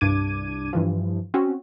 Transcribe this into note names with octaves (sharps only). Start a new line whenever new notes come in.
C2 G2 D4 D6 G#6 D#7
G2 E3 F3
C4 C#4 F#4